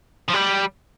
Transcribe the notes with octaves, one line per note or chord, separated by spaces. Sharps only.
F3
G3